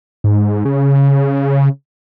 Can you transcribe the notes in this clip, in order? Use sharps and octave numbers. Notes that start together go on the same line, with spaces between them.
G#2
C#3